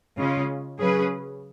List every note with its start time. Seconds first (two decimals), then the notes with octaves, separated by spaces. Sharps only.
0.18 C#3 G#3 C#4 F4
0.80 C#3 F#3 C#4 G#4 B4